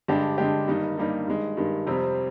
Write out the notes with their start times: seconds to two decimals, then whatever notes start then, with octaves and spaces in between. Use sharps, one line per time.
0.08 G2 D3 G#3 D4 G4
0.38 G2 D3 G#3 D4 G4
0.68 G2 D#3 G3 A#3 D#4
0.97 G2 D#3 G3 A#3 D#4
1.28 G2 D#3 G#3
1.57 G2 D#3 G#3
1.87 F2 C3 G3 C4